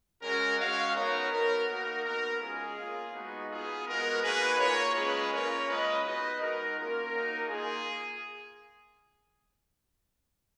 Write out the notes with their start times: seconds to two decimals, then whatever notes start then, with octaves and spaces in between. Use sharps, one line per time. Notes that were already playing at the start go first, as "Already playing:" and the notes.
0.22 G#3 C#4 F#4 A#4
0.58 G#3 C#4 F#4 C#5 F5
0.94 B3 D#4 F#4 A#4 C#5
1.31 B3 F#4 A#4
1.67 A#3 D#4 F#4 A#4
2.04 B3 F#4 A#4
2.40 G#3 C#4 F4 G#4
2.76 A#3 F4
3.13 G#3 B3 D#4 F#4
3.49 B3 F4 G#4
3.85 G#3 B3 F#4 A#4
4.22 A#3 D#4 F#4 G#4 B4
4.58 A#3 F4 A#4 C#5
4.94 G#3 C#4 F4 G#4 B4
5.31 A#3 C#4 F4 A#4 C#5
5.67 G#3 C#4 F4 B4 D#5
6.03 B3 D#4 F#4 B4 D#5
6.39 G#3 D#4 F#4 A#4
6.76 A#3 C#4 F4 A#4
7.13 A#3 D#4 F#4
7.48 A#3 F4 G#4